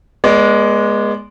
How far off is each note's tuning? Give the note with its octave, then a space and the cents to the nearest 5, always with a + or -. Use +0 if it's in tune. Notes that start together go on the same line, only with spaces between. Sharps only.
G#3 +0 B3 -35 D5 -25